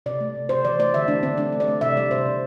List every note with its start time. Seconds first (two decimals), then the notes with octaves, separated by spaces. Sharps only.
0.06 C3 D5
0.21 A3
0.35 C3
0.49 C3 C5
0.65 E3 D5
0.79 A3 D5
0.94 D3 E5
1.08 A3 D4
1.23 D3 C4
1.37 A3 D4
1.52 A3
1.60 D5
1.68 A3
1.81 C3 E5
1.97 G3 D5
2.11 C3 C5
2.26 C3